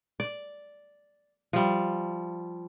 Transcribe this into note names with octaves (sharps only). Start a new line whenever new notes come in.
D5
F3 G3